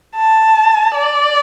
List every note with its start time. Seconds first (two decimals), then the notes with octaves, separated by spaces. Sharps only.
0.16 A5
0.95 D5